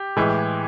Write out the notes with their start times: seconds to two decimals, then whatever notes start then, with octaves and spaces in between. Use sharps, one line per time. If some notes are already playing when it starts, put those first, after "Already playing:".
Already playing: G4
0.16 A2 E3 G#3